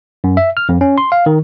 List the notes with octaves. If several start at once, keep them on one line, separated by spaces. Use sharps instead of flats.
F#2
E5
F6
F2
C#4
C6
F5
D#3